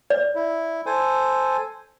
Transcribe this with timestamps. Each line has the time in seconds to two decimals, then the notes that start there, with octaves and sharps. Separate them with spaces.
0.10 D5
0.35 E4
0.86 A4 C5 G#5